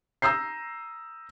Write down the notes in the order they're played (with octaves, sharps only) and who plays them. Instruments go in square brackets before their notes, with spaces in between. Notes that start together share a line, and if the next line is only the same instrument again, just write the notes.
[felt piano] A#5 D#6 E6 G6 C7